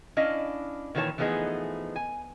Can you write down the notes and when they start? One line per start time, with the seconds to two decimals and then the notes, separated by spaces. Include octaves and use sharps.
0.17 C#4 D4 E4 D#5 F5
0.95 A#2 D#3 E3 F#4 C#5 A5
1.18 E3 F3 A3 B3 D#4 G#4
1.96 G#5